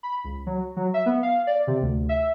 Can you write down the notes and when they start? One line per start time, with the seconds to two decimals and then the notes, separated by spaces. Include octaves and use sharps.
0.03 B5
0.24 C#2
0.46 F#3
0.77 F#3
0.94 E5
1.06 B3
1.23 F5
1.47 D5
1.67 C3
1.82 D2
2.09 E5